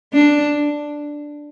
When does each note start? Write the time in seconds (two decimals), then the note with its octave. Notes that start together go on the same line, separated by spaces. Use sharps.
0.13 D4